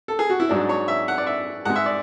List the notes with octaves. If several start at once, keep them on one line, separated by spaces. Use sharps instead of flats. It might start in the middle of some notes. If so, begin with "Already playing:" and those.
A4
G#4
F#4
E4
G#2 F#3 D4
C#5
E5
F#5
D5
E5
G#2 G#3 F#5
E5
D5